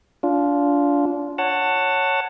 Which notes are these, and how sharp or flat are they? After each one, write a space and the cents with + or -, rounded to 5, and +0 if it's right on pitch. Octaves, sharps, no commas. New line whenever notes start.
D4 -30 F4 +0
C#5 +0 F#5 +0 A5 +20